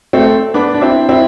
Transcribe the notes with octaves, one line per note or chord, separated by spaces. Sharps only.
A3 C4
B3 D4
D4
C4 E4
C4 E4